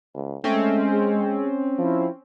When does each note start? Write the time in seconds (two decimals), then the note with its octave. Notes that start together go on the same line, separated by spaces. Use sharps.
0.14 C#2
0.44 G#3 A3 C4 C#4
0.93 G#4
1.78 F3 E4